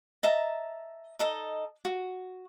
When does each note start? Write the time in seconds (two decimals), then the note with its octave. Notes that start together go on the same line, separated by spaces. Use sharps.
0.23 D#5 E5 A5 A#5
1.19 D#4 A4 D#5
1.85 F#4